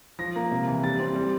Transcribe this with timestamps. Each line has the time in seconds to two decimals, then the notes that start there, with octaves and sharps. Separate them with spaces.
0.19 F3 A#6
0.36 A#3
0.51 C3
0.67 E3
0.83 G3 A6
1.00 C4
1.15 G3